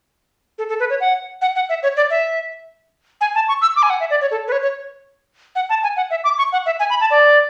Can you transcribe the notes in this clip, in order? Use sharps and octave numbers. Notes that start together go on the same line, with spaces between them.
A4
A4
B4
C#5
F#5
F#5
F#5
E5
C#5
D5
E5
G#5
A5
C#6
E6
D6
G#5
F#5
E5
D5
C#5
A4
B4
C#5
C#5
F#5
A5
G#5
F#5
E5
D6
C#6
F#5
E5
G#5
B5
A5
D5